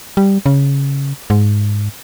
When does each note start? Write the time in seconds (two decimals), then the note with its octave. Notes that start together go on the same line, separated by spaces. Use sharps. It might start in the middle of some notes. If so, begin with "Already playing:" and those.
0.17 G3
0.46 C#3
1.30 G#2